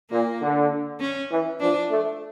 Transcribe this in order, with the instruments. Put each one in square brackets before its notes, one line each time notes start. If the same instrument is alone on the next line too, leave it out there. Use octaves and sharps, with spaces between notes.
[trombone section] A#2 [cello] A#3
[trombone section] D3
[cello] C#4
[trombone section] E3
[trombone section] F3 [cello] D4
[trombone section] A3